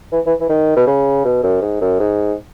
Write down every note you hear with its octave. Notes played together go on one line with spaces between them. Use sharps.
E3
E3
E3
D#3
B2
C#3
B2
F#2
G#2
F#2
G#2